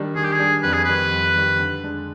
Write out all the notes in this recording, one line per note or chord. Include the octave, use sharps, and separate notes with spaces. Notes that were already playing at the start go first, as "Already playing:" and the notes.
Already playing: D#3 G3 D4
D#3 G#4
G4
G#4
G3 D4
F2 B4
G#4
D#3 G3 B4
F2
D#3 G3
D3
G#3 D4